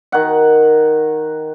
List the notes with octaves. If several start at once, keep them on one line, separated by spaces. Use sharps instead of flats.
D#3 F#5